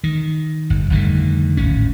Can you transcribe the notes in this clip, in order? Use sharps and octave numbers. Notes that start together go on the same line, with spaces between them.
D#3
G1
F1 D3 D#3 G3
D1 G#1 C#4